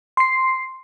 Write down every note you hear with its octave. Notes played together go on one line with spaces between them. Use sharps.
C6 C7